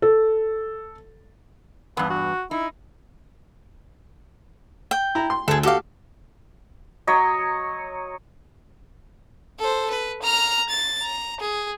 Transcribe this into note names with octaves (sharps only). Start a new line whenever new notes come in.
A4
E2 G2 B3
F#4
D#4 E4
G5
E4 A#5
C6
D2 G#4 A4
F#4 G4 A4 F5 D6
F#3 C#5 D#5
A4 C5
B4
A#5 F6
A6
A#5
G#4